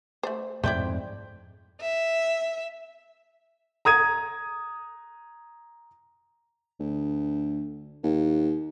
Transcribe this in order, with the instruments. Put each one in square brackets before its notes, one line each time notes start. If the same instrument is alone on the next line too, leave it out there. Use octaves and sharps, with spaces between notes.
[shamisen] A3 C5
[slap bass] F2 G#2 [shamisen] A3 E4 [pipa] C5 D5 G5
[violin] E5
[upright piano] A#5 D#6 G#6 D#7
[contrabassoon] D2
D#2